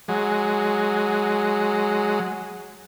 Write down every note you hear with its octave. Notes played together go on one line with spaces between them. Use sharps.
F#3 G#3